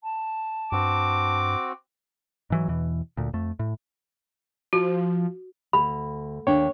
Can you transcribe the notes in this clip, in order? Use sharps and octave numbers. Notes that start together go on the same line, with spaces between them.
A5
G2 C4 F#4 D6
G#2 E3 F#3
E2 B2 E3
D2 A#2
F2 A3
A2
F3 F#4
D2 B5
D#2 D4 C#5 G5